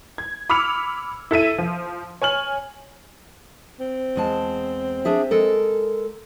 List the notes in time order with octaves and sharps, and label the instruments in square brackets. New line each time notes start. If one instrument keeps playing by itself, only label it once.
[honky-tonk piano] G#6
B5 D6 E6 F6 C#7 F7
E4 A4 E5 D#7
F3
C#5 G#5 F6 F#7
[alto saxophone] C4
[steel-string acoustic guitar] E2 G#3 A5
D4 G#4 E5
G#3 A4 A#4